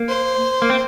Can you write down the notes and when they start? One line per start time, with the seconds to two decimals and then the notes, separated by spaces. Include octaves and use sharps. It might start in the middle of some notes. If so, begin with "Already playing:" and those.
Already playing: A#3
0.08 C5
0.62 A#3
0.70 C4